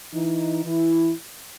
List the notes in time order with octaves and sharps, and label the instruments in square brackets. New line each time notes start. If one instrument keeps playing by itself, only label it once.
[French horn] E3 [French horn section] D#4
[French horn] E3 [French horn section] E4